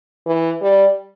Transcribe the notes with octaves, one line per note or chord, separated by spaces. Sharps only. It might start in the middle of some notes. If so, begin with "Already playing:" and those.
E3
G3